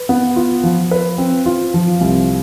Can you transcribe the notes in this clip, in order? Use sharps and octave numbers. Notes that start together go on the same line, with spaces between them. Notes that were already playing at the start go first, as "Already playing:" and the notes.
Already playing: B4
B3
F4
F3
B4
C4
F4
F3
C2